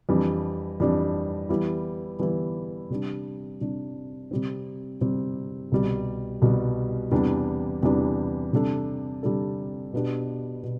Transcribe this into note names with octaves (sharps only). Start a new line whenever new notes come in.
F2 E3 G3 D4
F2 E3 G3 D4
E3 G3 B3 E4
E3 G3 B3 E4
C3 G3 D4
C3 G3 D4
C3 G3 C4
C3 G3 C4
C2 B2 G3
C2 B2 G3
E2 C3 E3 G3 D4
E2 C3 E3 G3 D4
C3 G3 D4 A4
C3 G3 D4 A4
B2 B3 D4 G4
B2